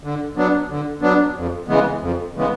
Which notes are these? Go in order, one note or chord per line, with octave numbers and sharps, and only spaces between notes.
D3
F#3 B3 D4
D3
F#3 B3 D4
F2
C#3 E3 G#3 B3
F2
C#3 E3 G#3 B3